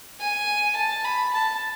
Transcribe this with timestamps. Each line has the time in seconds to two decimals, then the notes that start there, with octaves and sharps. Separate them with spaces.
0.20 G#5
0.77 A5
1.05 B5
1.33 A5